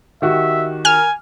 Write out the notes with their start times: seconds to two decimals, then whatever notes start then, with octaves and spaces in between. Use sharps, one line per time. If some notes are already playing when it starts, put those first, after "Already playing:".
0.22 D#3 F#4 G4 E5
0.85 A#4 G#5 F6